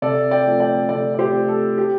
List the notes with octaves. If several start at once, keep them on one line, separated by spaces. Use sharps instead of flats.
C3 A4 D5
D5 G5
F3 A3 C4
D5 G5
C3 A4 D5
D5
G4 C5
F3 A3 C4
A4
G4